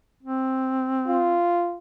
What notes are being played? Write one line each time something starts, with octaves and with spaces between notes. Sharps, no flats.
C4
F4